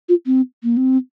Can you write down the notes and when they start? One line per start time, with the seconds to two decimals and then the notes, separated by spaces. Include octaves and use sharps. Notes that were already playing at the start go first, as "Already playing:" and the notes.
0.09 F4
0.26 C4
0.63 A#3
0.77 C4